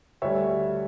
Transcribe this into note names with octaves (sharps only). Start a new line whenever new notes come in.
D2 D3 G3 C#5 E5